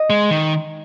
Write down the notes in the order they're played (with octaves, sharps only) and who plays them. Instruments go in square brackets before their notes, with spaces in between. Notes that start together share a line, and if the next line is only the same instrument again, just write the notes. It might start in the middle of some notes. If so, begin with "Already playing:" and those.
Already playing: [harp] D#5
[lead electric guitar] G#3
D#3